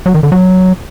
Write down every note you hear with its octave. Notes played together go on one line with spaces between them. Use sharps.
F#3
D#3
D3
F#3